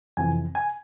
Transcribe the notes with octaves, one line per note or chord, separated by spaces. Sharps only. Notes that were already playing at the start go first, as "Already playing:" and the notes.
F2 C3 E3 G#5
G#5